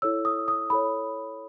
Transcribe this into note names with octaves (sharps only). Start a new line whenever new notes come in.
E4 A4 C#5 E6
D#6
D#6
E4 A4 C#5 B5